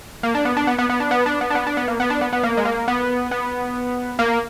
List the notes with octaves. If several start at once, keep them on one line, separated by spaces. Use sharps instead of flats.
A#3
D4
B3
D4
B3
B3
B3
D4
B3
D4
B3
D4
B3
D4
B3
A#3
B3
D4
B3
B3
A#3
G#3
A#3
B3
B3
A#3